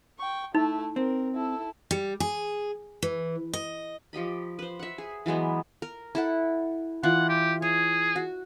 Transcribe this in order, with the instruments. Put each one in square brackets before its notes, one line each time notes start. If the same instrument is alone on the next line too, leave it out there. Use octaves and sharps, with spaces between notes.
[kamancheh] G5 C#6
[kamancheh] A3 E4 [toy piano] D#4
[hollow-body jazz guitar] C4 [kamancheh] A#4
[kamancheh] E4 A4
[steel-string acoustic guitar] G3
G#4
E3
D#5
[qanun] F3 G4 D#5 B5
B4 C5
E5 F#5
G#4
E3 F#3 G#3 B3
A#4
E4 A4 F#5
[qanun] E3 F4 D5 [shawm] F#5
[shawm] G4
[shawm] G#4 [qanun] C#5
[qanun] F#4